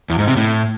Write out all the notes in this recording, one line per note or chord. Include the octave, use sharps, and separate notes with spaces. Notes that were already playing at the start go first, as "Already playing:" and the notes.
E2
G#2
C3
A2